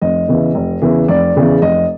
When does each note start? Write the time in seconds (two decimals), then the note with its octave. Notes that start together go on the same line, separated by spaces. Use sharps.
0.01 F1 D#5
0.28 E2 C#3 E3
0.55 F1
0.82 E2 C#3 E3
1.08 F1 D5
1.36 E2 C#3 E3
1.62 F1 D#5